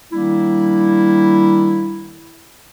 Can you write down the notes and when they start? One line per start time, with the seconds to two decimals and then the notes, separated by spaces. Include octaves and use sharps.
0.13 D#3 G3 A#3 D4 E4